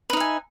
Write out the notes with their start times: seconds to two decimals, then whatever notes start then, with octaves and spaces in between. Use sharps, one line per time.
0.10 B4
0.13 D#4
0.17 E5
0.20 G#5